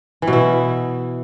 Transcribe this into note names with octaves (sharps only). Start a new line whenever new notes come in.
E3
B2
E4